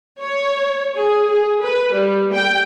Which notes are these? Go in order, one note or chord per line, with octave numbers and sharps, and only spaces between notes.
C#5
G#4
G#4
B4
G3
G5